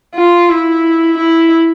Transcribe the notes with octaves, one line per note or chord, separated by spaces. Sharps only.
F4
E4
E4